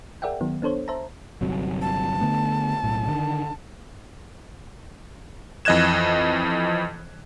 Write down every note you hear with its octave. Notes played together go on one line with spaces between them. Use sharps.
G#4 A#4 D5 E5 F#5 G5
D#3 F#3 B3
B3 D4 A4 C5 C#5
C5 E5 A5 A#5
G1 C3 F#3
A5
D3 A3 B3
B1 A2
D3 D#3
F2 E3 D#5 F#6 G#6 E7